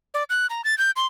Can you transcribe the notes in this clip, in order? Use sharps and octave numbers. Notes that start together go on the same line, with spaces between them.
D5
F#6
A#5
A6
G6
C6